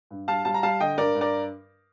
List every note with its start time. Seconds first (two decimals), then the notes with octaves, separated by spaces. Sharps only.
0.11 G2
0.28 G3 F5 A5
0.45 G3 F5 A5
0.54 A#5
0.63 G3 F5 A5
0.80 D3 D#5 G5
0.98 G2 A#4 D5
1.15 G2
1.21 A#4 D5